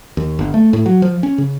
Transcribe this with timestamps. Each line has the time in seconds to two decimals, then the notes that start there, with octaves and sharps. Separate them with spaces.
0.17 D#2
0.39 G1
0.54 A3
0.73 A2
0.86 F#3
1.02 F3
1.23 C#4
1.38 C#3